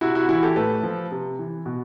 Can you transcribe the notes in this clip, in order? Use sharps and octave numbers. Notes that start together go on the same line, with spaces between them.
C3 E4 F#4
E4 F#4
E3 E4 F#4
G4 A4
A2 A4 B4
F3
C3
E3
B2